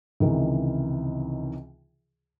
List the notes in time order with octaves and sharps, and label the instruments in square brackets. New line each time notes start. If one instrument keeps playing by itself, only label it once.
[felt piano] C#2 C3 D#3 E3